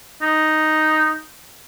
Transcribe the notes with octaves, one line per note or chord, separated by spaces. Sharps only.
D#4